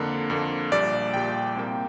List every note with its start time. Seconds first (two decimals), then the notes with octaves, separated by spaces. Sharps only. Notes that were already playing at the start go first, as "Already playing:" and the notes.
Already playing: F2 D3 A#3
0.30 F2 D3 A#3
0.71 A#1 A#2 G3 D5
1.14 A#1 A#2 G3 G5
1.55 C2 C3 G3 A#3